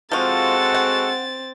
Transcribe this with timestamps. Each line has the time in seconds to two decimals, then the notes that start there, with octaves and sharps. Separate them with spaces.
0.12 F3 G#3 C4 F4 F#4 A4 A6
0.74 F#5